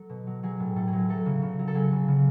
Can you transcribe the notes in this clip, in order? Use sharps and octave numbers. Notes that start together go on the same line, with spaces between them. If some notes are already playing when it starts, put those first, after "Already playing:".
Already playing: F#3 A4
B2
F#3
F#3 G#4
A2
A2 A4
G#4
F#3
G#4
F#3 A4
C#3
C#3
F#3
A4
F#3 G#4
C#3
C#3